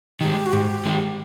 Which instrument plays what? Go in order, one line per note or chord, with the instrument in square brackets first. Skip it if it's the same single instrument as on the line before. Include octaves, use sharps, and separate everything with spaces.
[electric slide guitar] D#3 G#3 [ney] G4
[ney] F#4
[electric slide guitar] G#2 [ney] G4
[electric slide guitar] D#3 G#3